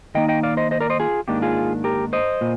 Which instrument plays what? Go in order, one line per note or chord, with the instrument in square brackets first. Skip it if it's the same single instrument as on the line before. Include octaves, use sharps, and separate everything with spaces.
[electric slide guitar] D#3 A#3 D#4 D#5 G5
D#5 G5
D5 F5
C5 D#5
C5 D#5
A#4 D5
C5 D#5
F4 G#4
G#2 D#3 A#3 D4 G4
F4 G#4
G4 A#4
C5 D#5
A#2